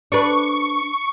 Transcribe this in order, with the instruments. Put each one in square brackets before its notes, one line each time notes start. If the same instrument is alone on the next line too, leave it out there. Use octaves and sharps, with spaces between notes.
[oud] D4 B4 [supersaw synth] C#6